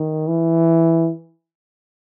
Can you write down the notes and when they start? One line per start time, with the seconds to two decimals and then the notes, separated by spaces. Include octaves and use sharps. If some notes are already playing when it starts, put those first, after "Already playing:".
Already playing: D#3
0.27 E3